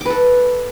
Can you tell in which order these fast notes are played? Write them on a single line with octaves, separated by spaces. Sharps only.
D6 B4 A4